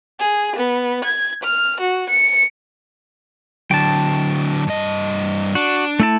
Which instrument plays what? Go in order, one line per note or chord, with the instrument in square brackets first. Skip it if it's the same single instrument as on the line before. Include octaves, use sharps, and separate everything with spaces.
[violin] G#4
B3
G#6
F6
F#4
C#7
[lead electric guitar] D3 F#3 [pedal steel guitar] G5 A5
[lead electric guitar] G2 D#5
[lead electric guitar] D4 [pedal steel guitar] F#4
[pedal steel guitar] A3 E4 A5